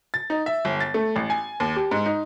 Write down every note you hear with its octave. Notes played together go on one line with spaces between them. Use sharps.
A6
D#4
E5
G1
A6
A3
A1
G#5
D#2
G4
G#2
D#4